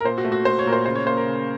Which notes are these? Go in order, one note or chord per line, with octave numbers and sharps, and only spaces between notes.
A#4
A#2 C5
F#4
A3
F#4
A3 C5
C#5
A#2 A#4
C5
C#3 C5
C#5
A#3 C5
A#4
C#3